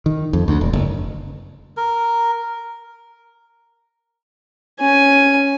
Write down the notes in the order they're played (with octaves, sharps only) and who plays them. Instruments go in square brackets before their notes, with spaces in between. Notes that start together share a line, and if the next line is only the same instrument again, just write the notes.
[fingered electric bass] D#3
F2
D2
E1
F#1
[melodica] A#4
[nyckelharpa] C#4 G#5